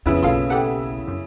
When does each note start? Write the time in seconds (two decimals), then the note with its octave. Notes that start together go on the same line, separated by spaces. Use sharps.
0.06 F2 C#3 B3 E4
0.23 F#1 B1 F4 A4 F5
0.50 G4 A4 F#5
1.08 F#2